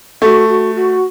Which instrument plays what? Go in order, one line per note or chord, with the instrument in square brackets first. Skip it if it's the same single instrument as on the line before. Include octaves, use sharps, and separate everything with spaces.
[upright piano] A3 [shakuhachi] F#4
[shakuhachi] F#4
F#4